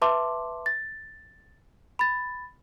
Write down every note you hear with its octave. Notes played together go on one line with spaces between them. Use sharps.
B4 E5 A5 C6 D6
A6
B5 A6